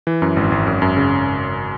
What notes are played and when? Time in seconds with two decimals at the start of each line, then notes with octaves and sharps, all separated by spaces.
0.07 E3
0.22 F#2
0.37 G#1
0.52 G#1
0.67 F#2
0.82 F#2
0.97 C#3